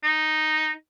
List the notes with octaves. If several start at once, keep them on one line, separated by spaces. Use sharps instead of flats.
D#4